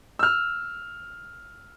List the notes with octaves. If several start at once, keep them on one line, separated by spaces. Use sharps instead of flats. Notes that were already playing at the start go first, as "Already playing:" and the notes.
E6 F6